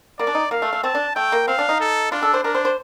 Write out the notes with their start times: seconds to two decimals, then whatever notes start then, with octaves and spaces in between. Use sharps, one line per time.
0.19 A#3 D5
0.27 D4
0.35 D#4
0.51 A#3 F5
0.62 A3
0.73 A3
0.83 C4 A5
0.95 D4
1.15 A3 G5
1.32 A#3
1.48 C4 F5
1.58 D4
1.69 D#4
1.80 A4
2.11 D4 F4
2.23 A4
2.34 C5
2.44 D4 A#4
2.55 C5
2.65 C5